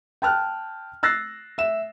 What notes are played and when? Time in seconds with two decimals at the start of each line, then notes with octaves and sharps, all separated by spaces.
0.22 G5 A5 F6 F#6
1.03 E6 F#6 A6 A#6 C7
1.58 E5 E7